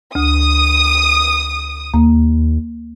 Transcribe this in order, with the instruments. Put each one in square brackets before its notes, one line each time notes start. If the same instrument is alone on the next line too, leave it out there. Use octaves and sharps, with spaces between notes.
[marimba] D2 [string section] D#6
[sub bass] D#2 [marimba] A#3